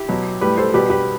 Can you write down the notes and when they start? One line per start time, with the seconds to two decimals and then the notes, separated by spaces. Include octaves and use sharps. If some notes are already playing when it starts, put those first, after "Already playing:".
Already playing: E4 G4
0.09 B2 F#3
0.41 A2 G3 G4 B4
0.57 A4 C5
0.74 B2 G3 G4 B4
0.90 G4 B4